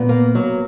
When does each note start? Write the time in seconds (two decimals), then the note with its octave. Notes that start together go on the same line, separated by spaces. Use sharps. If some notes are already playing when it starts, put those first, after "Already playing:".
Already playing: A#2 B3
0.09 A#3
0.35 F#3